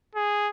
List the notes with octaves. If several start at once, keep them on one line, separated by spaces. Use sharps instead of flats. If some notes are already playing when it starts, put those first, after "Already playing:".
G#4